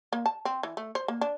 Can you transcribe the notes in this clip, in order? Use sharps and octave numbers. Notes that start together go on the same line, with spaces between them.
A#3
A5
C4
E3
A3
C5
A#3
D4